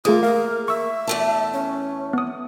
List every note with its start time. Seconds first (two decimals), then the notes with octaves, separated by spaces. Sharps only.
0.05 A3 A#3 F4 G#4 D#6
0.23 A#4 F5
0.68 E5 C#6 E6
1.07 E2 A3 A5
1.53 C#4
2.13 B3 D#6